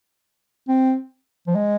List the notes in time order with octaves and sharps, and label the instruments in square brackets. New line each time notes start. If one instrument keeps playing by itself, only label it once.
[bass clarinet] C4
F3
G#3